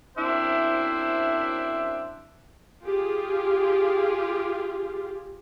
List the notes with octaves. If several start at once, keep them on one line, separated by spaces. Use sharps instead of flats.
F#2 C4 D4 E4 C5 E5
F4 G4 G#4